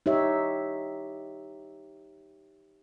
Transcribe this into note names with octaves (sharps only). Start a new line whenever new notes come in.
D#4 G4 C#5 E5